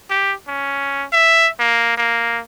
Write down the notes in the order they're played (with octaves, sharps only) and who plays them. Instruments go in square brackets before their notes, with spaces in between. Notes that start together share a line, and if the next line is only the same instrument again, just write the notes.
[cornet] G4
C#4
E5
A#3
A#3